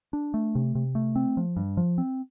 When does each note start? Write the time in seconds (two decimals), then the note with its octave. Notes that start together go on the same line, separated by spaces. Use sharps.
0.13 D4
0.34 A3
0.55 C3
0.75 C3
0.95 A3
1.16 C4
1.37 F3
1.57 G2
1.77 F3
1.98 C4